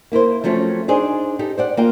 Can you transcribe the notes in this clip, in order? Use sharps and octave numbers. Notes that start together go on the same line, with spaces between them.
A#3 E4 A#4 C5
F3 F#3 A3 C4 C#4
D4 D#4 G#4 C5
D#4 G4 A4
C5 D5 F#5
A#3 F4 G5